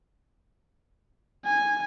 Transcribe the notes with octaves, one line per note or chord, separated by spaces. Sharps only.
G#5